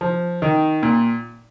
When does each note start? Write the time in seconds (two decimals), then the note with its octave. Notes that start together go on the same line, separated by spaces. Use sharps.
0.01 F3
0.42 D#3
0.83 A#2